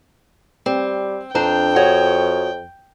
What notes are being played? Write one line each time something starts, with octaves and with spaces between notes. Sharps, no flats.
G3 C4
F2 D4 C5 G5 A#5
F#4 G#4 C#5